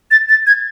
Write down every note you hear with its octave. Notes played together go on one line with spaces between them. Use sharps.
A6
A6
G#6